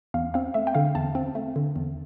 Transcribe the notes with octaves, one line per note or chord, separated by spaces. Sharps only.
E2 F5
C4 F5
A3 E5
G5
D3 F5
E2 A5
C4
A3
D3
E2